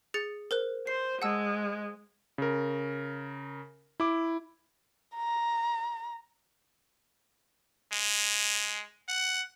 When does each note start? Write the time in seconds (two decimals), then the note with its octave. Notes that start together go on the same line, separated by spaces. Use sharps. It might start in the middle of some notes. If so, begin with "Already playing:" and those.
0.14 G#4 A6 C#7
0.51 A#4 C5 F#6
0.87 C5 C7
1.22 G#3 F#5 A5 E6
2.38 C#3 A#4
4.00 E4 D6
5.15 A#5
7.92 G#3
9.08 F#5